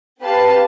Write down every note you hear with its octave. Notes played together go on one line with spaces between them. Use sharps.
C4 G4 B4 F5 A5